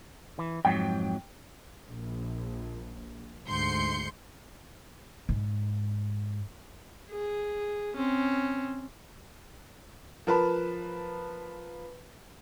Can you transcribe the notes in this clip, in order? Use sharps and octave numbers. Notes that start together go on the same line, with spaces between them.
E3
F2 G#2 F#3 G5
A#1
D2 G#2 C6 G6 C7 C#7
G#2
G#4
C4 C#4
F3 A#4 B4 A5 B5